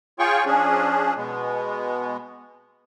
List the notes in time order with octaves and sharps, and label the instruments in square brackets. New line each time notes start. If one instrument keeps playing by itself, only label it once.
[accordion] F4 G#4 C#5 G5 C#6
F3 C#4 D4 G#4
B2 G#3 B3